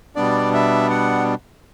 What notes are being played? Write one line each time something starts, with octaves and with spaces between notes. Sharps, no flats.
B2 G3 B3 D4 D5
E5
F#5